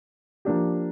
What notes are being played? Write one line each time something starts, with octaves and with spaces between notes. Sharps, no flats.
F3 A#3 D4 G4